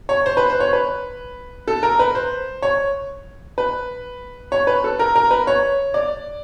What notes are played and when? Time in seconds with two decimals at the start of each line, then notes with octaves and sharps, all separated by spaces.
0.09 C#5
0.26 C5
0.37 B4
0.50 C5
0.60 C#5
0.73 B4
1.68 A4
1.83 A#4
1.99 B4
2.15 C5
2.62 C#5
3.58 B4
4.52 C#5
4.67 B4
4.84 A4
4.99 A#4
5.16 A#4
5.31 B4
5.47 C#5
5.94 D5